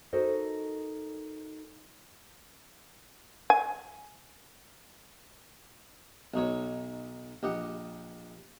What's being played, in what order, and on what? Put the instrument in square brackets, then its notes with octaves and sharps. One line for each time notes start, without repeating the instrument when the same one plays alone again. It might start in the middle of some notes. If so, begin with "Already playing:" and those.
[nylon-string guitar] D#4 F#4 A4 A#4 C5 D#5
[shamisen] G#5
[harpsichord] B1 D#4 F#4 C#5
A#1 G4 D#5 F#5